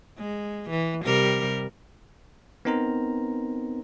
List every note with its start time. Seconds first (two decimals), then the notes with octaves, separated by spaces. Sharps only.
0.18 G#3
0.70 E3
1.04 C3 G3 A#4
2.65 B3 C4 D#4 A#4 C5 A#5